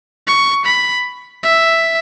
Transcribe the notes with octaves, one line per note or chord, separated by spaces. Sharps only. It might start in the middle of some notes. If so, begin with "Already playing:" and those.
C#6
B5
E5